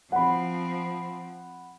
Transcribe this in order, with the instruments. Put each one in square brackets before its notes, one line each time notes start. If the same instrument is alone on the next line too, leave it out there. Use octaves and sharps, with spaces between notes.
[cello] F3 C4 [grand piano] F#5 B5